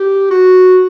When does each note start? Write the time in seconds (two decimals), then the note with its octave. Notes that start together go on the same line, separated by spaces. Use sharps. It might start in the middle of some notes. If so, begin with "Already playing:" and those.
Already playing: G4
0.31 F#4